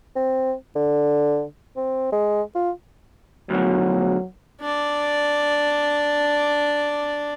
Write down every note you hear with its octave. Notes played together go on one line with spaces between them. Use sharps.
C4
D3
C4
G#3
F4
D2 B2 F#3
D4 D5